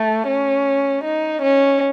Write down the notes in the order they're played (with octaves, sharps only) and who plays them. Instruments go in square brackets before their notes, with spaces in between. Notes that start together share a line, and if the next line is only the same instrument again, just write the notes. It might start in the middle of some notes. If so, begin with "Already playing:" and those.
Already playing: [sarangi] A3
C#4
D#4
C#4